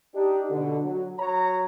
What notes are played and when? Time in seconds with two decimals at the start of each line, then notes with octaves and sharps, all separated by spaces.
0.15 D4 D#4 G4
0.50 B2 D3
0.85 F#3
1.19 F#3 C#5 A#5